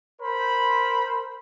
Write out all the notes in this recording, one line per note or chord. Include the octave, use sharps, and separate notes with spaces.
A#4 C5 B5